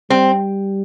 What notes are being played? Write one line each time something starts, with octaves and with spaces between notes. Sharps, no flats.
G3 C4